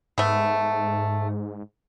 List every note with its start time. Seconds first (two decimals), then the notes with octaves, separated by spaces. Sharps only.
0.18 G#2 A3 B3